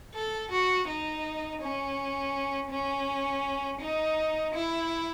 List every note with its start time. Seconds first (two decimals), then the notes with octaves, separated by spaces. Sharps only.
0.14 A4
0.51 F#4
0.88 D#4
1.61 C#4
2.71 C#4
3.81 D#4
4.54 E4